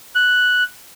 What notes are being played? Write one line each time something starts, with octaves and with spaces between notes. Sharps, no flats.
F#6